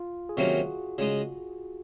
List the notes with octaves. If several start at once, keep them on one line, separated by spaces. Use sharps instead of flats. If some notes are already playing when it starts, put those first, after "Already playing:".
Already playing: F4
G#4
C3 D#3 F#3 A#3 C#4 F#4
C#3 G#3 D#4